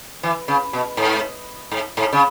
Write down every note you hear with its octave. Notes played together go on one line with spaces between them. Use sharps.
E3
C#3
B2
G#2
G#2
G#2
C#3